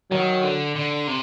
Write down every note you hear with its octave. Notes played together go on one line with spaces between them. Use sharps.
D#3 F#3
D3
D3
C3